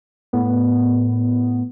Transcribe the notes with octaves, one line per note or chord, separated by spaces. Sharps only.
A2 B3